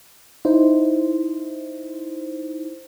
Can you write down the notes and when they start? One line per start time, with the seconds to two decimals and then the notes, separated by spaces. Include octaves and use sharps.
0.45 D#4 E4 C5